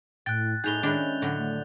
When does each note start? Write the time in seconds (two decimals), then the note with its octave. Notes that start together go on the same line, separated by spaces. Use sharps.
0.26 A2 G5 F#6 A6
0.64 A2 D#4 G#4 G6 F7 G7
0.83 D#3 G#3 C#4 D4 E4
1.22 A2 D3 F#3
1.37 A3